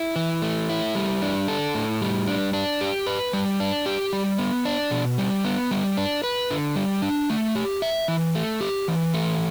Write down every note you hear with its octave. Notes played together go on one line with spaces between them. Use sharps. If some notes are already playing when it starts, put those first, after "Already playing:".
Already playing: E4
E3
A3
E4
G3
D4
A4
A2
G3
D4
D4
G4
B4
G3
D4
G4
G3
B3
D4
B2
G3
B3
G3
D4
B4
D3
G3
D4
A3
G4
E5
E3
A3
G4
E3
A3